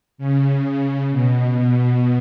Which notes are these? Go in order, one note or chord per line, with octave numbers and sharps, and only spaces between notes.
C#3
B2
B2